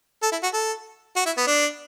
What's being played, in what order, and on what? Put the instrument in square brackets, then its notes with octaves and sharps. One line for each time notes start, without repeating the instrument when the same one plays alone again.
[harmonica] A4
E4
F#4
A4
F#4
E4
B3
D4